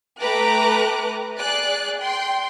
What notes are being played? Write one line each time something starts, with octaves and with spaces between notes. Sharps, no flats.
A3 B4 G5 A#5 D6 F#6
G#4 D5 F#6
G5 C6